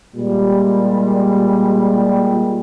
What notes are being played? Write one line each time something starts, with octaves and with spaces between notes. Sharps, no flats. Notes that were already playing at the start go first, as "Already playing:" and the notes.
A#2 G3 G#3